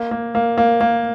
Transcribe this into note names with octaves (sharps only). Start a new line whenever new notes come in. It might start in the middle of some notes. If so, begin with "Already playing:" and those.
Already playing: A#3
A#3
A#3
A#3
A#3